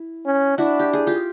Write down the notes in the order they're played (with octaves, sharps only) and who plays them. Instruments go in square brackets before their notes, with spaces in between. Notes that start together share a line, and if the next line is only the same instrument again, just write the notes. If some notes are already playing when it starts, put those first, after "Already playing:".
Already playing: [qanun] E4
[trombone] C#4
[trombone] D4 [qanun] E4 F#4
[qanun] G4
G#4
F4 G4